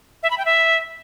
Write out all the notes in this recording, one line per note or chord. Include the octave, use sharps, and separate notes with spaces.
E5
B5
G5
E5